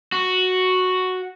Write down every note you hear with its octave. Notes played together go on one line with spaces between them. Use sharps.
F#4